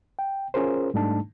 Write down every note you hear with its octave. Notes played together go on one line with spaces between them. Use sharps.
G5
C#4 F4 G#4 A#4 C5
G#2 G3 A3 D4 D#4 A5